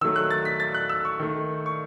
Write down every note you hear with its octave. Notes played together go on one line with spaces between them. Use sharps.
D#3 F#3 A3 E6
F#6
A6
B6
A6
F#6
E6
C#6
D#3 A3
C#6